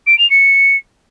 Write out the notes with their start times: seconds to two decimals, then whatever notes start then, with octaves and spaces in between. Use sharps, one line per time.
0.06 D7
0.18 F7
0.30 C#7